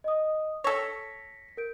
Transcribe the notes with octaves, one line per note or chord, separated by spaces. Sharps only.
D#5 D#6
A4 C#5 A#6 B6 C#7
A#4 G6 D7